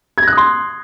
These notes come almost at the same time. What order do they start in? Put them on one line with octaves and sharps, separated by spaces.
G#6 A#6 F#6 D#6 C6